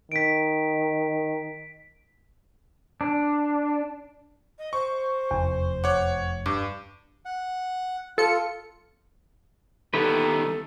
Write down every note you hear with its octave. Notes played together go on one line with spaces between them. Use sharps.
D#3 B6 D7
D4
D#5
C5 C#6
F1 E2
C#5 F#5 D6
G2 D6
F#5
F4 A4 C#7
D#3 G3 B3 E4 A4 B4